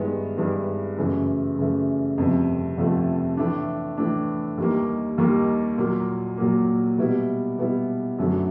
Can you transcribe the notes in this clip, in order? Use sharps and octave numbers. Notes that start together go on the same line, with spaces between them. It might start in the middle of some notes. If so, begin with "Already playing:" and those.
Already playing: G2 D#3 G#3 B3 E4
G2 D#3 G#3 B3 E4
F#2 C#3 E3 A3
F#2 C#3 E3 A3
G1 F2 C3 F3 A3
G1 F2 C3 F3 A3
A2 E3 A3 D4
A2 E3 A3 D4
D#2 D#3 G3 A#3
D#2 D#3 G3 A#3
A#2 F#3 A#3
A#2 F#3 A#3
B2 G3 B3 E4
B2 G3 B3 E4
F#2 D3 F#3 A3 D4